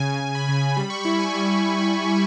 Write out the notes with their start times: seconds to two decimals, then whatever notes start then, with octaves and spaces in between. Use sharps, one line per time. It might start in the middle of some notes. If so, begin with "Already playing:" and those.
Already playing: C#3 G#5
0.20 C#3
0.35 B5
0.49 C#3
0.77 G3 B5
0.90 C#6
1.03 E4 B5
1.19 G#5
1.34 G3